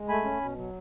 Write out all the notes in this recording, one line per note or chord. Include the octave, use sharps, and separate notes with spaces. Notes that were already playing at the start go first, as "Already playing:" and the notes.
Already playing: G#3
A3 G#5 B5
C#4
B2
F#3